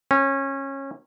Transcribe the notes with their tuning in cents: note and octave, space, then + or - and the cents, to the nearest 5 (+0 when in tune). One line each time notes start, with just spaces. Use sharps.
C#4 -25